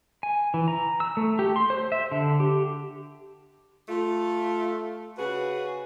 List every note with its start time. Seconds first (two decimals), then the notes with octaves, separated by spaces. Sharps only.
0.23 G#5
0.54 E3
0.68 A#5
1.00 E6
1.17 A3
1.39 G4
1.56 C6
1.70 C5
1.92 E5
2.12 D3
2.40 G4
3.88 A3 F4
5.18 C#3 F#4 G#4 B4